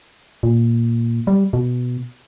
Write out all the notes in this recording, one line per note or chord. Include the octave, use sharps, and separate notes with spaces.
A#2
G3
B2